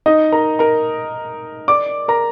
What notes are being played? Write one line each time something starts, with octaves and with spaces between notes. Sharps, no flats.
D#4 D#5
A#4 A#5
A#4 A#5
D5 D6
A#4 A#5